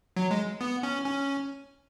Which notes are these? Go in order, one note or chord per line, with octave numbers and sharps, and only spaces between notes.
F#3
G#3
B3
C#4
C#4